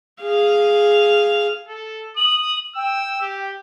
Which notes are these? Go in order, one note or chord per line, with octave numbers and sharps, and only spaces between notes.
G#4 F5
A4
D#6 F#7
G5 E6
G4